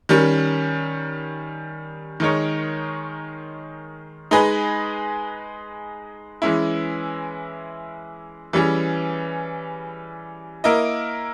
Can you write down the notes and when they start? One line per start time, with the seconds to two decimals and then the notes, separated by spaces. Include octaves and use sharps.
0.09 D#3 G3 C#4
2.20 D#3 G#3 D#4 A#4 C#5
4.31 G#3 D#4 G#4 B4 D#5
6.42 E3 G#3 C#4 E4
8.53 E3 G3 C#4 G#4
10.64 A#3 E4 A#4 D#5